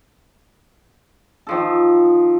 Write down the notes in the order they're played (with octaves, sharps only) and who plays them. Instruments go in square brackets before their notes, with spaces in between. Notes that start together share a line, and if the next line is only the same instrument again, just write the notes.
[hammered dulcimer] D#3 F3 A4